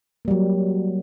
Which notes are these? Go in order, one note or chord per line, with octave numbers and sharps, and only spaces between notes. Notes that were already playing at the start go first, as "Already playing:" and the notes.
F#3 G3 A#3